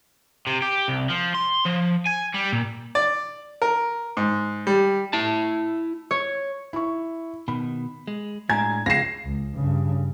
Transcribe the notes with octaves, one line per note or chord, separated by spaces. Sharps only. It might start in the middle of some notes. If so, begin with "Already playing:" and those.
C3
G4
C2
F3
C6
F3
G#5
G3
A#2
D5
A#4
G#2
G3
E4 A5
C#5
E4 C#6
B2 D#3 B5
G#3
A2 G#3 D4 G#5 A#5 G#6
C#2 F5 A#6 C7 E7
C#2
G2 C#3